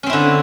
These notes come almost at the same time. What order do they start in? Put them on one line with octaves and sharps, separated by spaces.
C#4 C4 E4 D3